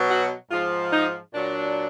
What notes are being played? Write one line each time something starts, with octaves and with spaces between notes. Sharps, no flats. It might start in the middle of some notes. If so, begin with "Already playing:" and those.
Already playing: B2 F#3
F#4
G#2 F3 F4
D#4
A#2 F#3 D4